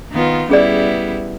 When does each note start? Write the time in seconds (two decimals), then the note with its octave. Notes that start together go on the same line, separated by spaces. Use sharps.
0.12 D#3 B3 F4
0.50 G3 B3 C#4 E4 G#4 D5